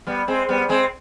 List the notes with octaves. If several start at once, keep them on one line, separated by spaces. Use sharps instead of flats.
G3 B3
G#3 C4
G3 B3
G#3 C4